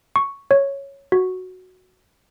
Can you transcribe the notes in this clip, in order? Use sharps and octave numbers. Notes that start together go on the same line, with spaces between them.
C#6
C#5
F#4